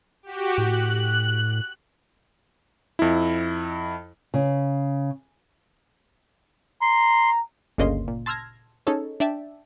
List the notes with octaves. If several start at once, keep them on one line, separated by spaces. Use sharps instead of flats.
F#4 G4
A2 F#6
F2 E4
C#3
A#5 C6
G1 D2 C#3 A#3 D#5 C6
A#2
A5 C6 E6 F6 G#6 A#6
C#4 D#4 G#4 A4 C#5
D4 D5 E5 G5 A5